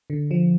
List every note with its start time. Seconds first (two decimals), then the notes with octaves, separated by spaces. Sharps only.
0.10 D3
0.31 F3